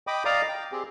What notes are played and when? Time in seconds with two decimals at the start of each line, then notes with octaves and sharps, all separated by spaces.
0.07 D#5 G5 B5 D6 D#6
0.25 D5 D#5 F5 A#5 D6 D#6
0.49 G5
0.72 C4 G4 G#4